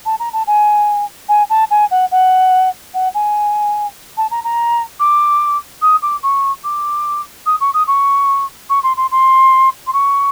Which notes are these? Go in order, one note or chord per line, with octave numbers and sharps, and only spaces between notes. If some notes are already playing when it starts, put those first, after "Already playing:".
A5
A#5
A5
G#5
G#5
A5
G#5
F#5
F#5
F#5
G#5
A5
A#5
A#5
D6
D#6
D6
C#6
D6
D#6
C#6
D#6
C#6
C#6
C6
C6
C6
C6
C#6